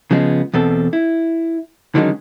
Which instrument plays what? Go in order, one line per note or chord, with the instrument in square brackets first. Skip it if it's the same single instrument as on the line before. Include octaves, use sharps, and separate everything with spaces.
[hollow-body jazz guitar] C#3 F3 G#3 B3
E2 B2 C4 A4
E4
D3 D#3 F#3 G#3 C#4